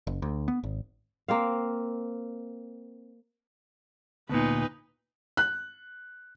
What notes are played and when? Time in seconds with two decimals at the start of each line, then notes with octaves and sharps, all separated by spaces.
0.07 F#1
0.22 D2
0.48 B3
0.64 G#1
1.28 A#3 C4 F5
4.30 D2 A#2 B3 D#4 B4
5.37 F#6